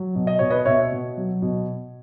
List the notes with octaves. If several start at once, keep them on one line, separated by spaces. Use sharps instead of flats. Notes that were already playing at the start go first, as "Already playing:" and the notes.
Already playing: F#3
B2
D#5
B2 C#5
B4 D#5
B2 C#5 E5
B2
F#3
B2